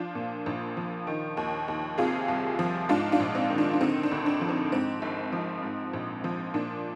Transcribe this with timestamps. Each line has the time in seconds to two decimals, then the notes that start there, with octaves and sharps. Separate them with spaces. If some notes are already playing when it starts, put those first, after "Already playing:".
Already playing: F3 D4 F4
0.15 A#2
0.46 A#1
0.77 F3
1.07 D#3
1.37 D#2
1.68 D#2
1.98 C3 F4 G#4
2.28 C2
2.59 F3
2.89 G#2 D4 F4
3.12 D4 F4
3.20 A#1
3.35 C4 D#4
3.50 D#3
3.58 D4
3.73 D4
3.81 D3 C4 D#4
4.03 D4
4.12 D2
4.26 D4
4.41 F3
4.49 C4 D#4
4.72 G#2 C4
5.02 G#1
5.32 F3
5.63 G#2
5.93 A#1
6.24 F3
6.54 A#2 D4